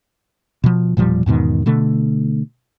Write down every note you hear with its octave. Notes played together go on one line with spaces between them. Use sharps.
B2 F3
E1 A#2 F3 G3
E2 G#2 B2 D#3
B2 D3 A3